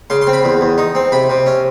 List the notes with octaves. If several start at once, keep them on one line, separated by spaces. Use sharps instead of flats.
C#3 C6
C6
C4
B5
E2
E2
D#4
C4
C3 B5
C3
C#4